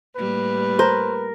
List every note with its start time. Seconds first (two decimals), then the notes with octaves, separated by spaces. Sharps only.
0.16 A2 G3 A#3 B4
0.79 A#4 C5